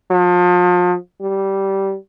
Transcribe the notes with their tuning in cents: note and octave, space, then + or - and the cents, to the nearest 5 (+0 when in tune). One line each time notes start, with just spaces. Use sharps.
F3 +35
G3 -15